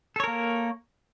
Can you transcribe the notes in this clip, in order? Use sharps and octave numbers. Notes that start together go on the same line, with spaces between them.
A#3 A4 A#4 C#5